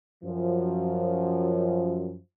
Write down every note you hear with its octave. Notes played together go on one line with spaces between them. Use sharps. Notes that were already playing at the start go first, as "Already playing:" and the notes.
F#2 F3